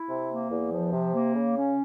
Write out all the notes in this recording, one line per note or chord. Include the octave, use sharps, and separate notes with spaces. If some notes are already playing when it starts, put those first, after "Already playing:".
Already playing: E4
C3
A#3
E2
F3
C3
A#3
C#3
C#4